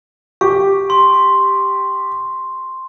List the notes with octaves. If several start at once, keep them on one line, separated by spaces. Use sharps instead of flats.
G4 C#6
C6